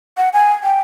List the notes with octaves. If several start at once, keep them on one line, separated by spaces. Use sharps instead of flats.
F#5
G#5
G5